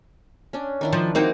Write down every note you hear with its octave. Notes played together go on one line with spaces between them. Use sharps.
C#4 D4
D#3 D4 E4
F3
A#3 C4 D#4 E4 F#4